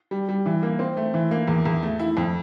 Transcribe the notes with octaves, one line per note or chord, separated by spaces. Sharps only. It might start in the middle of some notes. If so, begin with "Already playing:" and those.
G3
G3
E3
A#3
C4
A3
E3
A#3
E2
E2
A3
E4
F2